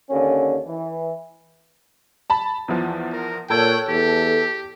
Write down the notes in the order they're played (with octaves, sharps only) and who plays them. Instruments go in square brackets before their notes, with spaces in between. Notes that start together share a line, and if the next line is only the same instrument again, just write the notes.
[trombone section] D#2 D3 C#4
E3
[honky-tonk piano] A5 B5
E2 E3 F3
[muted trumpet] A#4
[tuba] A#2 [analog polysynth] A4 C#5 F#6 [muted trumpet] G5 [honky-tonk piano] A5 E6 G#6
[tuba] E2 [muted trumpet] G4 [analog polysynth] A4